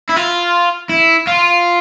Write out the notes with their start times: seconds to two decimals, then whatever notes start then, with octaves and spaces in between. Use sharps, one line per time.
0.09 E4
0.17 F4
0.89 E4
1.27 F4